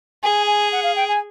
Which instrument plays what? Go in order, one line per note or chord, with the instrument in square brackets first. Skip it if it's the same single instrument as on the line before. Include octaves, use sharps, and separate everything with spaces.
[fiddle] G#4 [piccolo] G#5
[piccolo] G#5
F#5
F5
G5
G#5